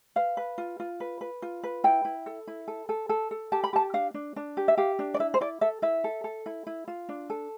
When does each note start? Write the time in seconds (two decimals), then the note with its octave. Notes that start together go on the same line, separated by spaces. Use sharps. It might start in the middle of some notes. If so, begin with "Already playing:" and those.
0.16 B4 F5
0.37 B4
0.58 F4
0.80 F4
1.00 B4
1.21 B4
1.42 F4
1.63 B4
1.84 E4 G5
2.05 E4
2.26 A4
2.47 E4
2.68 A4
2.89 A4
3.09 A4
3.31 A4
3.52 G4 A5
3.64 B5
3.73 G4 A5
3.94 D4 F5
4.14 D4
4.36 D4
4.57 G4
4.68 E5
4.77 G4 F5
4.99 D4
5.14 D5
5.19 E4 E5
5.34 C5
5.41 E4 D5
5.61 A4 E5
5.82 E4 E5
6.04 A4
6.24 A4
6.46 E4
6.67 E4
6.88 F4
7.09 D4
7.30 A4